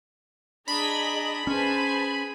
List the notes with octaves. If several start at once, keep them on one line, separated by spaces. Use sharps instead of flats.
D4 G#4 D#5 A#5 B5
C#4 G#4 B4 C5 G#5 A5